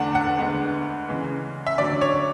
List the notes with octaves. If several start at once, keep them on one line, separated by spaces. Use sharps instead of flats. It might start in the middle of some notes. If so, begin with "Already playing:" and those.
Already playing: E2 D3 A3 D4 F#5
F#5
D2 D3 G#3 B3
C#3 E3 G#3
E5
D2 D3 F#3 C#4 D5
C#5